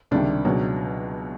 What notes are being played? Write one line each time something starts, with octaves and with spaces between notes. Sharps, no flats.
C#2 C3 D#3 G3 D4
C#2 B2 F#3